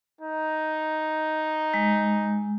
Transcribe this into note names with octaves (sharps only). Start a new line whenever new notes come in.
D#4
G#3